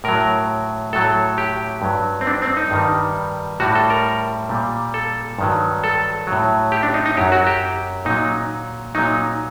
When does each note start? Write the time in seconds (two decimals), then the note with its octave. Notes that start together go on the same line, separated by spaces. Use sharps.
0.04 A2 F#3 A#4
0.93 A2 F#3 A4
1.38 G4
1.82 G2 F#3
2.21 C4
2.27 D4
2.42 C4
2.57 D#4
2.71 G2 D#3 G3
3.60 A2 G3 F#4
3.75 A4
3.90 A#4
4.49 A#2 G3
4.94 A4
5.39 G2 D#3 F#3
5.84 A4
6.27 A2 F#3
6.72 G4
6.83 D4
6.94 D#4
7.06 D#4
7.17 F#2 F#3 G4
7.32 F#4
7.47 G4
8.05 A#2 F#3 D#4
8.95 A#2 F#3 D#4